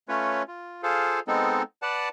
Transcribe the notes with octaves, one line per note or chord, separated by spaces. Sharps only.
A3 C#4 F4 B4 C#5
F4
F4 G#4 A4 C5 F5
G#3 B3 C4 D#4 A4
B4 D5 F#5 A5